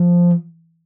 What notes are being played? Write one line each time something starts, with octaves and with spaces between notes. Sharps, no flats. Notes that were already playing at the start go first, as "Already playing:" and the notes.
Already playing: F3